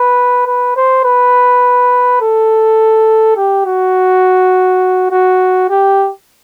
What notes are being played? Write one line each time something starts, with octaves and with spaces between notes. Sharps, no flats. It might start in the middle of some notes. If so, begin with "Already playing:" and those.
Already playing: B4
B4
C5
B4
A4
G4
F#4
F#4
G4